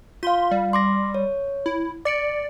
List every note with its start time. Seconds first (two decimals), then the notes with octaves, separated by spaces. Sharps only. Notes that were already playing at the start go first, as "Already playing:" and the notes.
0.23 F4 F5 C6
0.51 G3
0.73 C6 D6 A#6
1.15 C#5
1.66 E4
2.05 D5 D6 C#7 D7